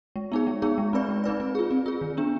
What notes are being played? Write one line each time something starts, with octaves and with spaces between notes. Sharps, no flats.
G#3
B3 D#4 G#4
G#3
B3 D#4 G#4
G#3
C4 D#4 B4 D5
G#3
C4 D#4 B4 D5
C4
F4 G#4
C4
F4 G#4
D#3
B3 D4